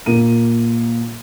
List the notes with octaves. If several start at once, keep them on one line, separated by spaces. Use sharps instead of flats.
A#2 A#3 D#7